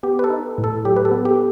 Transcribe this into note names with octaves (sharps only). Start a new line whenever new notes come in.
B3 G4
B4
A4
D#4
A2
A4
F#3 G4
B4
A4
B3
G4